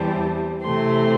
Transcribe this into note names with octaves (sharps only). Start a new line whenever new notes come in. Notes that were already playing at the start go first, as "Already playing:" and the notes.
Already playing: E2 E3 G3 C4 A5
C3 E3 A3 C4 C6